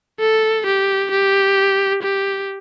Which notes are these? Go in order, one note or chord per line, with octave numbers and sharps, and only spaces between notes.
A4
G4
G4
G4